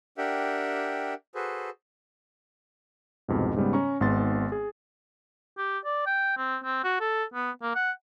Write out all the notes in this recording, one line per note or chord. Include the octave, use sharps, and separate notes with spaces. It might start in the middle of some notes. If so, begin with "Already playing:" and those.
D4 G4 A#4 E5 F#5 G5
F#4 G#4 A4 B4 C5
C2 F2 G#2 B2
G#2 C#3 G3 G#3 B3
C#4 A#5 C#6
G#1 G#2 B3 C6 A6
G#4
G4
D5
G5
C4
C4
F#4
A4
B3
A#3
F#5